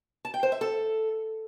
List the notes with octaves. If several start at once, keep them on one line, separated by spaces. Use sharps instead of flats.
A5
G5
C5
E5
A4